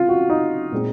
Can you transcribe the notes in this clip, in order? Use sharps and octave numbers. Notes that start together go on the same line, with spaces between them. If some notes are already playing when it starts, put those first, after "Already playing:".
Already playing: C4 F4
F#4
D#4
A#2 G#3 C4